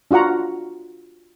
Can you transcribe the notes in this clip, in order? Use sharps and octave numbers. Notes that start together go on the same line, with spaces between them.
D4 F4 F#4 F#5 A#5